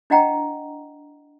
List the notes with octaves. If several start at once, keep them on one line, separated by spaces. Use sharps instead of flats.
D4 E4 D#5 F#5 G5 A#5